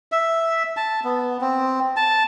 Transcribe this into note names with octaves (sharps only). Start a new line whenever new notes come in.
E5
A5
B3
C4
A5